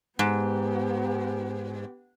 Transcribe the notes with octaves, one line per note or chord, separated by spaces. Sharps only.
G#2 B3 G4